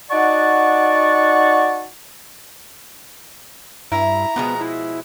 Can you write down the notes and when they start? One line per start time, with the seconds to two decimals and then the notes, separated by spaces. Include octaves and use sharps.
0.11 D#4 F#4 D5 F#5 A5 C#6
3.92 G2 E4 A#5
4.36 B2 F3 G#3 B3
4.61 E4